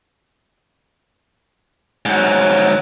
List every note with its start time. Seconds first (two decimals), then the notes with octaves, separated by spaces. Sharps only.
2.05 G#2 F#3